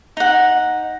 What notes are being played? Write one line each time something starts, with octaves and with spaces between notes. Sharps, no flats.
D#4 F#5